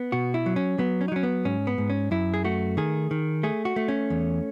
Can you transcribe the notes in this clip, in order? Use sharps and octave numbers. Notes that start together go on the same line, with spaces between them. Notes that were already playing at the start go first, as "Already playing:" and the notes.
Already playing: B3
B2 F#4
E4
F#3
C#4
F#3 B3
C#4
D#4
F#3 C#4
B3
G#2 C#4
B3
G#2
C#4
F#2 E4
G#4
A3 F#4
D#3 G#4
D#3
A3 G#4
F#4
A3
C#4
E2